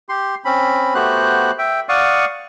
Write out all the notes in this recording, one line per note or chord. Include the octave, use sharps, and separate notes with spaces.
G4 C6
C4 C#4 B5
A3 B3 F#4 G4 C5 F#6
E5 G5
D5 F5 F#5 C#6 D#6